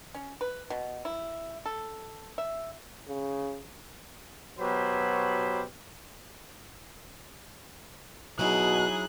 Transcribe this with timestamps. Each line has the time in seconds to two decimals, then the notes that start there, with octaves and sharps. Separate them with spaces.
0.15 C#4
0.41 B4
0.70 B2
1.05 E4
1.66 A4
2.38 E5
3.09 C#3
4.59 B2 F#3 G4 B4 C5 B5
8.39 B2 F#3 D#4 E4 G#4 F#6